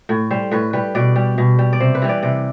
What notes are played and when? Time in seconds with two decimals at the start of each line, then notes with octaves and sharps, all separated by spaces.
0.09 A2
0.31 G3 C5
0.51 A2 B4
0.73 G3 B4
0.95 B2 D5
1.16 G3
1.38 B2
1.59 G3
1.73 D5
1.80 C3 C5
1.95 B4
2.02 E3 G3
2.09 D5
2.23 C3 D5